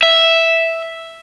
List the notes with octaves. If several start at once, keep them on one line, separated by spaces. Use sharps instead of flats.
E5